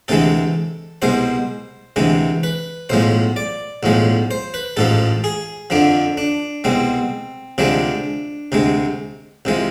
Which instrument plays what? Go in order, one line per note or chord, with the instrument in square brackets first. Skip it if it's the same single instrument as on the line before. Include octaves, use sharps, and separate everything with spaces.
[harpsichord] D2 C3 E3 G#3 A4
C2 B2 G#3 C5
D2 C3 E3 G#3
B4
B1 A2 F3 G#3 C5
D5
B1 A2 F3 G#3
C5
B4
A1 G#2 F3 A4
G#4
F2 D3 F3 D4
D4
C2 B2 G#3 C4
D2 C3 F3 G#3 D4
D2 C3 G#3
C2 C3 F3 G#3